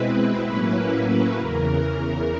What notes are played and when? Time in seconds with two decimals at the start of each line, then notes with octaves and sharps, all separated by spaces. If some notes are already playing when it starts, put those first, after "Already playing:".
Already playing: B2 G#3 C4 E4 B4
0.43 A2 F#3 A#3 C#4 E4
1.36 E2 C#3 E3 A#4